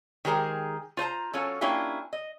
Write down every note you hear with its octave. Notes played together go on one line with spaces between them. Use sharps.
D#3 G#3 G4 G#4 A#4 C5
F4 C5 A5 A#5
F#3 C#4 F4 A4
A#3 C#4 D4 E4 F4 G4
D#5